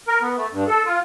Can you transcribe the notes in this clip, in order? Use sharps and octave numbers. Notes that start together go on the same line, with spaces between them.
A#4
B3
A3
G2
A4
F4